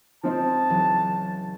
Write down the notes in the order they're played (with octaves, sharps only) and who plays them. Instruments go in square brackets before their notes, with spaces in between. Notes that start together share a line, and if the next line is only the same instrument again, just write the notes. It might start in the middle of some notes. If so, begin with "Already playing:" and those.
[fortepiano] F3 C4 D#4 [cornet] A5
[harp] C#2 E3 F#3